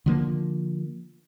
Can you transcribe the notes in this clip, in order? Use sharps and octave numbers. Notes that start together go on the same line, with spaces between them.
D3 F3 A#3